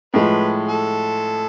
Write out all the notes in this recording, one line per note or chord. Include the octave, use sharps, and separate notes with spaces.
A2 F3 G#3 B4
A4